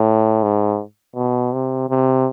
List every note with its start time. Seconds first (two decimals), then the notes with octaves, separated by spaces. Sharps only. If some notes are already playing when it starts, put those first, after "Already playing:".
Already playing: A2
0.43 G#2
1.15 B2
1.53 C3
1.89 C3